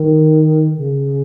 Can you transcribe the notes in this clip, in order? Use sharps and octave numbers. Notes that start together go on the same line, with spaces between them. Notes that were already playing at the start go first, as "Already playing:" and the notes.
Already playing: D#3
C#3